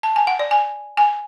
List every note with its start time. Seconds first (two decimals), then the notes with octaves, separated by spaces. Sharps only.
0.03 A5
0.16 G#5
0.27 F#5
0.39 D5
0.51 G#5
0.97 G#5